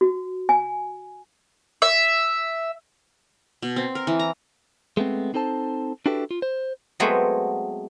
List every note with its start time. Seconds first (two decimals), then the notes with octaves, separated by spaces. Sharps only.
0.01 F#4
0.49 G#5
1.82 E5
3.62 B2
3.76 C4
3.95 A#4
4.07 E3
4.19 A#5
4.97 G#3 A3 B3 C4
5.34 C4 D#4 A4 C5 A5
6.06 D4 E4 F#4 G4 A4 B4
6.31 F4
6.42 C5
7.00 F#3 G#3 A3 B3 C4 C5